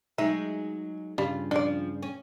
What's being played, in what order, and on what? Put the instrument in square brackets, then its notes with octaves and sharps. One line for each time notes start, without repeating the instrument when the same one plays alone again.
[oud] F#3 G#3 D#4 [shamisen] E5
[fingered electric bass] G2 C#3 [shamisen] G3 [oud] F4
[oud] F3 [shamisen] D4 D5
[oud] C#4